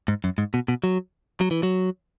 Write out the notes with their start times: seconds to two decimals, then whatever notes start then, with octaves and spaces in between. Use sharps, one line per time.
0.08 G#2
0.24 F#2
0.38 G#2
0.54 B2
0.68 B2
0.84 F#3
1.41 F#3
1.51 E3
1.63 F#3